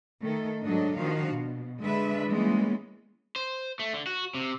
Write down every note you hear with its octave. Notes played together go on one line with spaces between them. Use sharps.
D#3 A3 A4
G#2 F#3 D4 A4 D#5
D#3 F3 D4 F#4 F5
B2
D3 G#3 D4 B4 E5
E3 G3 G#3 A#3 B3 C#4
C5
A3
D3
F#4
C3